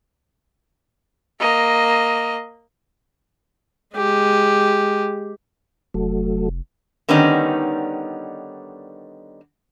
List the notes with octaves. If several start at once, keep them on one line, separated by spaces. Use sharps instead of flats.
A#3 D#5
G#3 G4
F1 F#3 A3
D3 D#3 G3 B3 C#4 D#4